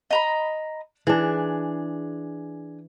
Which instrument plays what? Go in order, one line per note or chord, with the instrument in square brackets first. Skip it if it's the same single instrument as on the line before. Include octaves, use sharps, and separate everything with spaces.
[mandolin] D#5 A#5 B5
[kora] E3 D4 [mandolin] G#4